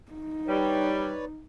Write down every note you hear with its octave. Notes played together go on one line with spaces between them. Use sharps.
D#4
G3 B4 C#5 D5